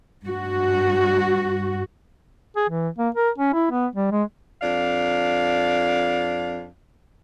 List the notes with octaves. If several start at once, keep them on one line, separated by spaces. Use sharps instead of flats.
G2 F#4
G#4
E3
A#3
A#4
C#4
E4
B3
G3
G#3
F2 D4 F5